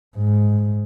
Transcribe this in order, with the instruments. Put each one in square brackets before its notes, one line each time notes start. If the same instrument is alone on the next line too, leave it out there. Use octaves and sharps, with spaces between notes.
[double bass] G#2